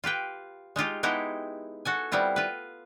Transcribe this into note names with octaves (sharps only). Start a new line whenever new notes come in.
F4 G4 B4 G5
G#3 D#4 F4 G4
G#3 B3 D#4 E4 G4
F#4 A4 G#5
G3 B3 C4 E4 F4
F4 B4